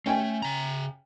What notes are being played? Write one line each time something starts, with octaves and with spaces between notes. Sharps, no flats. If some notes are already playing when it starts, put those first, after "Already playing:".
A3 C#4 G5 G#5
C#3 A#5